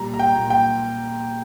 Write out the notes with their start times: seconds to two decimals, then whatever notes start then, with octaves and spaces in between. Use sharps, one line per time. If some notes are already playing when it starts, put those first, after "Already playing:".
Already playing: A#2 G3 A#5
0.14 A#5
0.19 G5
0.35 A#2
0.50 G5